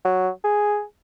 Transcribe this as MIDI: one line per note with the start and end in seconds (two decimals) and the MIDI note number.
0.05 0.28 54
0.44 0.82 68